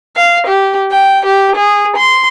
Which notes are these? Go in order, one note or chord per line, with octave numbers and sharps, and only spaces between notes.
F5
G4
G5
G4
G#4
C6